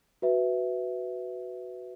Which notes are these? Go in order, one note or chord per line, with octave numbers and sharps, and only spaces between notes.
F#4 B4 E5